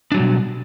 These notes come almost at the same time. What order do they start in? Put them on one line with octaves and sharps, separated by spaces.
D4 F#3 G3 B2